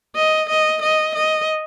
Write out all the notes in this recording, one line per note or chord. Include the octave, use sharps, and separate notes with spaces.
D#5
D#5
D#5
D#5